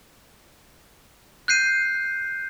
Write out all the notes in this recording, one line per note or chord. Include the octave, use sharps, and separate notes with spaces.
F#6 G6 C7 D#7